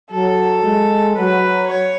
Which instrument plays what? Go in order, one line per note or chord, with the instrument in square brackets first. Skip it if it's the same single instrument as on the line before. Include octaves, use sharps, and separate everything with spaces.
[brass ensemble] F#3 [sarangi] A4
[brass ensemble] G#3
[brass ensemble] F#3 [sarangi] B4
[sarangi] C#5